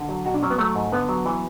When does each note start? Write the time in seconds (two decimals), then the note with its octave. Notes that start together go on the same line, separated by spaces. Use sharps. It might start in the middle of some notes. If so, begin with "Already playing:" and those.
Already playing: D3
0.09 F#3
0.25 B2 F#4
0.34 D4
0.43 F#3 C#4
0.50 B3
0.58 F#3 A3
0.75 G#2
0.92 D3 B3
1.09 F#3
1.26 E3